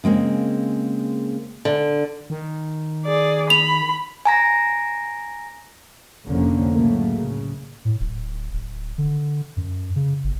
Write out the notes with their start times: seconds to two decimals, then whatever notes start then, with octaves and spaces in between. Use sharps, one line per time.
0.04 C#3 G#3 A#3 C4
1.65 D3
2.30 D#3
3.05 G#4 D5
3.50 B5 F7
4.25 G#5 A#5 A#6
6.25 F1 C2 D3 F3 A#3 C#4
6.75 A2 C#3 F#3 A3 A#3
7.16 C#3
7.85 A2
8.01 D1
8.53 D1
8.98 D3
9.57 F#2
9.96 C#3
10.24 G1